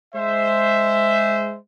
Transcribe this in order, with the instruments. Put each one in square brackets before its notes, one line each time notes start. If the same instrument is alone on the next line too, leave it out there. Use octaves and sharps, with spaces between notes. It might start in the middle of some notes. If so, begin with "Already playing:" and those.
[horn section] G#3 C5 E5